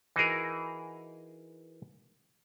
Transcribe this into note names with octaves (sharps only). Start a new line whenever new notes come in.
E3 D#4 F#4 G#4 A#4